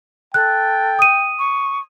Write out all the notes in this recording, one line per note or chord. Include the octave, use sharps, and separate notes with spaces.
A4 G5 F#6
D#6 D#7
C#6